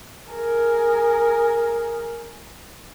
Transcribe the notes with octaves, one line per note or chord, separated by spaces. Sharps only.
G#4 A#4